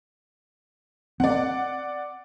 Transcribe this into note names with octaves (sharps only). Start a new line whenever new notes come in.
C4 D5 F#5